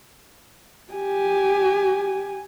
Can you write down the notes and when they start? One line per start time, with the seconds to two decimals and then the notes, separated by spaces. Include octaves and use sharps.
0.93 G4 G#5